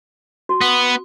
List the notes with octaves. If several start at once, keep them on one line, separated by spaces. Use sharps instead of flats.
F#4
B3